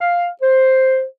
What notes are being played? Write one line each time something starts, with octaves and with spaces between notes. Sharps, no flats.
F5
C5